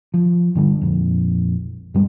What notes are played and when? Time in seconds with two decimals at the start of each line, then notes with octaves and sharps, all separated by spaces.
0.14 F3
0.55 G1 D3 G3
0.82 A#1 F2
1.94 G2 G3 G#3